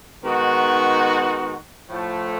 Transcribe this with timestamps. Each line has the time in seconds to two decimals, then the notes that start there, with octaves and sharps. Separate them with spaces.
0.24 D#3 G#3 B3 D#4 F#4
1.87 A2 F3 A3